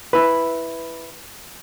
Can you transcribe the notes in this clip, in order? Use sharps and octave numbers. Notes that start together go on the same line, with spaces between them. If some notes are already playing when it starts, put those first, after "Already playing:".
E4 B4